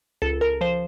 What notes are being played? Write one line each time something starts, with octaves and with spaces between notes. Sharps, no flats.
C#2 A4
A#4
F3 C5